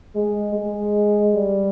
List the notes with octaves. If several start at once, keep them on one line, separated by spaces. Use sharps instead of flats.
G#3
G#3
G3